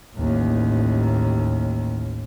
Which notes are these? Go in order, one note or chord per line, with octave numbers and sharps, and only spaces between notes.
A1 D#2